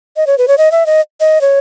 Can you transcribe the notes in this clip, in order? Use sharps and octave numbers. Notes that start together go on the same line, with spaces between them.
D#5
C#5
B4
C#5
D#5
E5
D#5
D#5
C#5